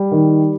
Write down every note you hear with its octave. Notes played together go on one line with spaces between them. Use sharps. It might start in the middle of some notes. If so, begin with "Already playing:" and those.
Already playing: G3
D#3